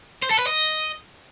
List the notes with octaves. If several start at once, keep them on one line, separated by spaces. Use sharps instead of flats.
C5
A4
B4
D#5